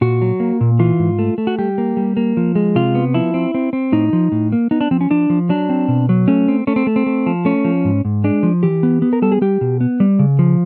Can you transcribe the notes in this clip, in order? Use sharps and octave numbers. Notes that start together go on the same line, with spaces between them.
A#2 F#4
F#3
A#3
A#2
E3 F4
G#2
A3
A3
F#4
G3 G4
A#3
G3
A#3
F3
G#3
C3 F4
B3
F3 E4
C4
C4
C4
A2 D#4
F3
A2
A#3
B3 D#4
D4
F3 C4
C#4
F3 D4
F3
F#3 D4
C4
B2
F#3
A3 C#4
C4
A3 C#4
C4
A3
C4
A3
F3
A3 C#4
F3
G#2
G#2
G#3 D4
F3
E3 G4
B3
B3
A#4
G3 A4
G#4
G3 G4
B2
B3
G3
C#3
F3